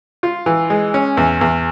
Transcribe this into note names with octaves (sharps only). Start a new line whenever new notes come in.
F4
E3
G#3
C#4
E2
E2